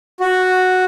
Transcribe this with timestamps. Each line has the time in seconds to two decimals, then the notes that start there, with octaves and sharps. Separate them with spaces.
0.20 F#4